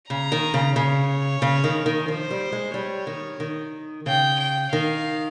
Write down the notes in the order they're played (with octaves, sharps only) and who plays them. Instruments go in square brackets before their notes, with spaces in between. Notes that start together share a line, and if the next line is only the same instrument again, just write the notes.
[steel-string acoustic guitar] C#3 [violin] A#5
[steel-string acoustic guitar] D#3
C#3
[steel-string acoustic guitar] C#3 [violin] C#5
[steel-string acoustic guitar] C#3
D#3
D#3
[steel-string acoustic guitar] F3 [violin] C5
[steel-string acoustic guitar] G3
G#3
[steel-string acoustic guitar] G3 [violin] C#5
[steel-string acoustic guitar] D#3
D#3
[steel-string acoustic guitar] C#3 [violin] G5
[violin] G5
[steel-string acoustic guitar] D#3 [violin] F5